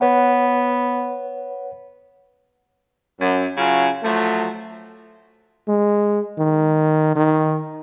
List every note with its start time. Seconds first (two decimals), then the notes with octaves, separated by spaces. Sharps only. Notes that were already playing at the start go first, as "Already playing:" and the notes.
0.01 B3 B4 C#5 F#5
3.20 F#2
3.57 C#3 F#3 F4 F5 G#5
4.03 F3 F#3 A3
5.68 G#3
6.38 D#3
7.16 D#3